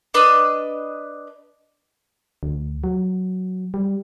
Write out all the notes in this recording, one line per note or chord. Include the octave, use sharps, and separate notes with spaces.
D4 B4 D#5
D2
F#3
G3